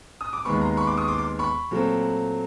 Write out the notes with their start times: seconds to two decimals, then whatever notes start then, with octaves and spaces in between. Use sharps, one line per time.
0.21 D#6
0.33 D6
0.45 D#2 D#3 G#3 B3 B5 C#6
0.61 A#5 C6
0.77 B5 C#6
0.87 C6 D6
0.97 C#6 D#6
1.08 C6 D6
1.18 C6 D6
1.39 B5 C#6
1.71 A#2 F#3 A3 C4